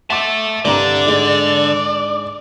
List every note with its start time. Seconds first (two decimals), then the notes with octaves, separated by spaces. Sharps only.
0.10 E5 F#5 A5 C6 D6
0.65 C2 G2 D3 D5 A#5
1.06 G#2 G#3 D#4